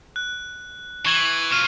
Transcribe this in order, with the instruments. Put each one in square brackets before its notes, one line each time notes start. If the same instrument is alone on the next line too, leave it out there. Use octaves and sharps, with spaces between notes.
[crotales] F#6
[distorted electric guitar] E3 [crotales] C#6 G#6 F#7
[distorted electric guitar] B2 F4 [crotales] C#6 F6 D#7